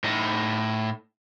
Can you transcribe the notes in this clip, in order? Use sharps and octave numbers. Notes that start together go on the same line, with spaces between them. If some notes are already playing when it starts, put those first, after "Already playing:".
A2 D#4